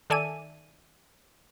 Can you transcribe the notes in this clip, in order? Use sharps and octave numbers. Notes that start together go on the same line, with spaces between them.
D#3 A4 D5 E5 G#5 D#7